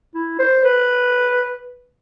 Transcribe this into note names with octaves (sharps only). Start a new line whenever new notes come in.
E4
C5
B4